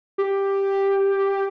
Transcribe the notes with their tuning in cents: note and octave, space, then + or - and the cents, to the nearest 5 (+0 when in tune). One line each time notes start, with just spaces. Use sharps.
G4 +5